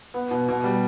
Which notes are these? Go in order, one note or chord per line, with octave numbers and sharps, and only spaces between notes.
B3
B2
B2
G3